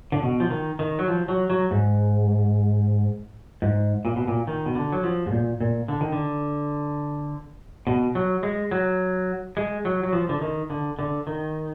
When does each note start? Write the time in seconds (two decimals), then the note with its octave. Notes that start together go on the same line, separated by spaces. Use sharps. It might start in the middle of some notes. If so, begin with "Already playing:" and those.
0.12 D3
0.23 B2
0.40 F3
0.50 D#3
0.79 D#3
0.99 F#3
1.08 F3
1.28 F#3
1.50 F#3
1.71 G#2
3.62 G#2
4.05 A#2
4.16 B2
4.27 A#2
4.47 D#3
4.66 B2
4.75 D3
4.92 F#3
5.03 F3
5.26 G#2
5.32 A#2
5.60 A#2
5.88 D3
6.01 D#3
6.12 D3
7.87 B2
8.15 F#3
8.43 G#3
8.71 F#3
9.57 G#3
9.85 F#3
10.03 F#3
10.13 F3
10.29 D3
10.42 D#3
10.70 D3
10.99 D3
11.27 D#3